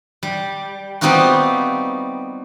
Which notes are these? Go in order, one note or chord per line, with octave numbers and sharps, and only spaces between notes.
G3
G3 B3 C4 D#4 F4 F#4